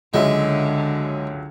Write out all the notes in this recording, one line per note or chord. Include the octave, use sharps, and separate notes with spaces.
C#2 D3 F#3 G#3 E5